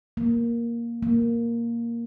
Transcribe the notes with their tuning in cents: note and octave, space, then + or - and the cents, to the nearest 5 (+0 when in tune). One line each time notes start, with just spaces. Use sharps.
A#3 +5
A#3 +0